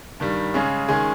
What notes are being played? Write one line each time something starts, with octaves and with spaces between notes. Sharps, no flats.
G2 D#3 G3
C#3 G#3 C#4 G#4
D#3 G#3 C#4 G#4